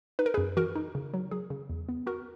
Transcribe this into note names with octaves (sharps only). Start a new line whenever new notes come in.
D#4 B4
A#4
F#2 G#4 B4
E3 F#4 A#4
D#4
C#3
F#3
F#3 G#4
C#3
E2
B3
B3 F#4 A#4